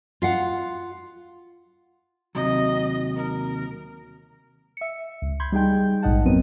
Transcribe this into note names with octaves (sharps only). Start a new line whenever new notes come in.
F4 F5 F#5
D#2 C3 F#3 D#5
A#4
E5 C#7
C#2
B5 C6 G6 G#6
G3 D#4 G#4 G5 G6
A#1 G#2 D#5 F#5 A5
F2 F#3 B3 C4 A#4 D#7